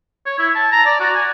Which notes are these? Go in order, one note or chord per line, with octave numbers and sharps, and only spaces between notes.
C#5
E4
A5
A#5
D5
F#4
G#5